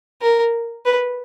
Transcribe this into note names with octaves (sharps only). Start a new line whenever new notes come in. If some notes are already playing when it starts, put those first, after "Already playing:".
A#4
B4